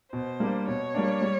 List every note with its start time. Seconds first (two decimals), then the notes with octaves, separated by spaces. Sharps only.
0.13 B2 C5
0.40 G3 A#3 D4
0.68 B2 C#5
0.94 G3 A#3 D4
1.21 G3